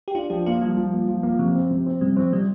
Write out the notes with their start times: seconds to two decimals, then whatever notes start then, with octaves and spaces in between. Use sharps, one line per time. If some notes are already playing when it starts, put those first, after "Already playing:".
0.08 G4
0.15 D4 F4
0.30 F3 G4
0.46 A#3 F4
0.61 F3 G3
0.77 F3
0.93 A#3
1.08 F3
1.23 A#3
1.39 C3 F3
1.55 C4
1.71 C3
1.86 C4
2.01 C3 G3
2.16 F3 C4
2.32 C3 G3